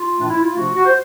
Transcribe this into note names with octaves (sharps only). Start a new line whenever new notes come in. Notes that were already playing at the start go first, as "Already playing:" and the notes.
Already playing: F4
A2 E3 A3 D4
E4
F4
C3 F3 A3 D4 F#4
F#4
C5